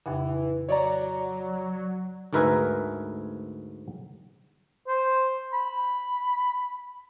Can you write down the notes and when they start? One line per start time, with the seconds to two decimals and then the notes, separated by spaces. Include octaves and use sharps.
0.06 F2 A#2 C#3 E3
0.69 F#3 C#5 D5 A#5
2.33 D2 G#2 A#4 B4 E5 G#5
4.88 C5
5.53 B5